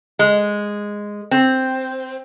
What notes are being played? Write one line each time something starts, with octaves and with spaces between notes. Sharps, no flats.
G#3
C4